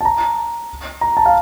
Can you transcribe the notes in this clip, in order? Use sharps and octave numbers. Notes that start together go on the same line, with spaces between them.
A5
A#5
A#5
A5
F5